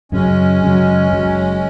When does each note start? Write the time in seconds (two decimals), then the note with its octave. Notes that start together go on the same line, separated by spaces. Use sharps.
0.12 F#2 C#3 F#3 G#3 C#4
0.61 F#2 C#3 F#3
1.10 F#1 F#2 C#3 F#3